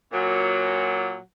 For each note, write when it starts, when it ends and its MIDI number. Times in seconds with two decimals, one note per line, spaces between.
0.12 1.18 46
0.12 1.18 54